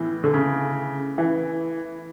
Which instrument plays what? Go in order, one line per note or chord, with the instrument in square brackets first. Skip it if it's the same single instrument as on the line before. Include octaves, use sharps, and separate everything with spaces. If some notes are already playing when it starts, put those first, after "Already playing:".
Already playing: [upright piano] A2 E3 B3 E4
[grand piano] D3
C#3
E3